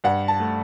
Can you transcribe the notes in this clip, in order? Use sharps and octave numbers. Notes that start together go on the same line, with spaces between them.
G2 F#5
A5
A3